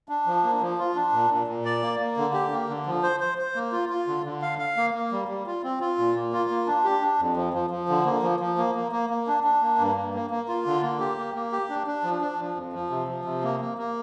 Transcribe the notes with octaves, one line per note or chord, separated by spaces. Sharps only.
D4
F3
A#3
F3
F4
D4
A#2
A#2
A#2
D5
A#3
A#3
D3
G4
A#3
D3
F3
C5
C5
C5
A#3
F4
F4
D3
D3
F5
F5
A#3
A#3
G3
G3
F4
C4
F4
A#2
A#3
F4
A#3
D4
G4
D4
F2
F3
F3
F3
D3
A#3
F3
F3
A#3
A#3
A#3
A#3
D4
D4
A#3
G2
A#3
A#3
A#3
F4
D3
A#3
G4
A#3
A#3
G4
D4
D4
F3
D4
F3
F2
F3
C3
F3
C3
A#3
A#3
A#3